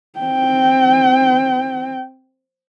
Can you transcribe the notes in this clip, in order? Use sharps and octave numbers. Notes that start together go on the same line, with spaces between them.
C4 G5